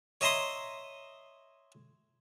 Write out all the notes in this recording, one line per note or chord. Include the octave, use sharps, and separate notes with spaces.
C#5 D#5 E5 A#5 C6 D#6